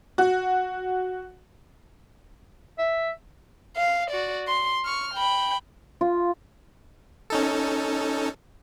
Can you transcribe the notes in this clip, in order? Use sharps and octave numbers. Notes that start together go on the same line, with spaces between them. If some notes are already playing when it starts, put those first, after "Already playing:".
F#4
E5
F5
F#4 D5
C6
C#6 F6
G5 B5
F4
C#4 D#4 A4